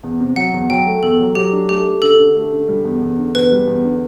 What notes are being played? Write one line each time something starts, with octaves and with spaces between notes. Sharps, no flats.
E2
C3
F#3 F#5
E2
F#3 G5
A3
E2 A4
F#3
F#3 G4
D4
A3 G4
A3
D3 A4
D3
A3
D3
G3
E2
E2
D3
E2 B4
G3
E2
D3